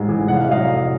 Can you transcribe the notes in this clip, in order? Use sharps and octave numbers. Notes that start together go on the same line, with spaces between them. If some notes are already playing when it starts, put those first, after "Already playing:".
Already playing: A1 G#2 G#3
E3
F1 F#5
F5
E5
F#3 D#5 F5